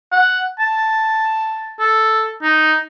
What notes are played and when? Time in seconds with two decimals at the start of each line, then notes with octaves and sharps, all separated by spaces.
0.12 F#5
0.60 A5
1.79 A4
2.42 D#4